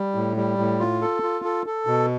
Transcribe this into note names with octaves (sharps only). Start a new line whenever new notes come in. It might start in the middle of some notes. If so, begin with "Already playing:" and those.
Already playing: G3
A2
G3
A2
F4
A4
F4
A4
A4
B2